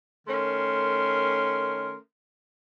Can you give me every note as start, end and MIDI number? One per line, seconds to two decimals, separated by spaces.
0.28 1.95 51
0.28 1.95 57
0.28 1.95 61
0.28 1.95 70
0.28 1.95 84